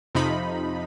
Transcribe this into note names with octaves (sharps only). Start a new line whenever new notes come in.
F2 C3 F3 D#4 B5